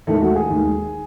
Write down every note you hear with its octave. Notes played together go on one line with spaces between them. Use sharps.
D#2 D#3 G#3 A3 A4
F#4
G#4
D#2 D#3 G#3